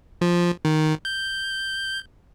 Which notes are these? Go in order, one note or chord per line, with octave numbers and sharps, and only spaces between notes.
F3
D#3
G6